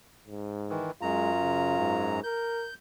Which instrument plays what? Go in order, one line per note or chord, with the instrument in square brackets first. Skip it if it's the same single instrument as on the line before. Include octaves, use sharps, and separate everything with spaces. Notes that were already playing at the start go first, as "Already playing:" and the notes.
[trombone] G#2
[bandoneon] D#3 E3
[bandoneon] F#2 A#5 [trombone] G#3 [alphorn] F4
[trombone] C#3
G#2
[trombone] A#4 [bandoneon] G6